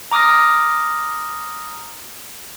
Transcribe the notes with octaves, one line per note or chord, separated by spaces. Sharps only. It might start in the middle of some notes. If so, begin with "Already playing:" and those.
A#5 D6 D#6 F6 A#6